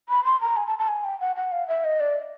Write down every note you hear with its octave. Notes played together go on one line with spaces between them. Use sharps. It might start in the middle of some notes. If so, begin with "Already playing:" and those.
B5
C6
A#5
G#5
A5
A5
G#5
G5
F#5
F#5
F5
E5
D#5
D5